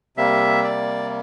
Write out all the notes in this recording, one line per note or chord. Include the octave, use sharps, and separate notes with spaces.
C3 G3 A#3 E5
D5